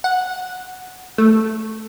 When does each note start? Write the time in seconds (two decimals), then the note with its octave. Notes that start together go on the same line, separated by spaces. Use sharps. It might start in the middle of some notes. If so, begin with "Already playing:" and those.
0.04 F#5
1.18 A3